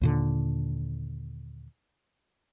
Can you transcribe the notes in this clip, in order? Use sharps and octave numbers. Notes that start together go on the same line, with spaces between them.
D#2 A#2 D3